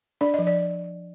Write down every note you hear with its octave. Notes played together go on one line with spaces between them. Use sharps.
D4 D5
F3 D#5
D5